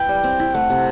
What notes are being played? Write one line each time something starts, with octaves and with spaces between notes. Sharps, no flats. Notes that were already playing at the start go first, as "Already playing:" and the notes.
Already playing: E4 B4 G5
G3
C4
E4
A3 F#5
C3